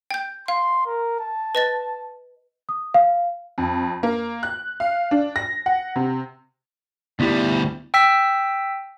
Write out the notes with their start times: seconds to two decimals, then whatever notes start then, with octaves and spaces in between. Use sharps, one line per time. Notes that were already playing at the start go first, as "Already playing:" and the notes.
0.11 G5 G6
0.48 F5 C6
0.86 A#4
1.20 A5
1.55 B4 D#5 A6
2.69 D#6
2.94 F5
3.58 F2
4.03 A#3
4.43 F#6
4.80 F5
5.11 D4
5.36 A#6
5.66 F#5
5.96 C3
7.20 D2 G3 B3 E4 G4
7.94 G5 E6 B6